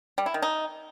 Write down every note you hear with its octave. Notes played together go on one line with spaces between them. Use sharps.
G3
E4
D#3
D#4